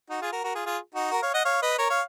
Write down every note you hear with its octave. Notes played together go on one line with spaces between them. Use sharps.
D#4 F#4
F4 G#4
F#4 A#4
F#4 A#4
F4 G#4
F4 G#4
D#4 F#4
F#4 A#4
C#5 F5
D#5 F#5
C#5 F5
B4 D#5
A#4 C#5
C#5 F5